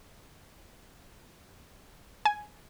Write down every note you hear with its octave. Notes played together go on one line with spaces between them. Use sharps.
G#5